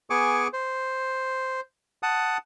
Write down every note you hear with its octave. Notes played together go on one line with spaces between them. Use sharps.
B3 G#4 G#5 C#6 D6
C5
F#5 A5 D#6